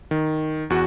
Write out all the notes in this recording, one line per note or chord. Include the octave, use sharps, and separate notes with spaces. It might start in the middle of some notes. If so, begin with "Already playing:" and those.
D#3
E2 F#4